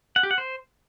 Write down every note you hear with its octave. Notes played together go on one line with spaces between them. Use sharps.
F#5
G4
F#5
C5